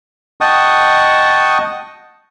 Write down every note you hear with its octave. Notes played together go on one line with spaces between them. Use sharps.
D#5 F#5 G5 A5 C#6 D#6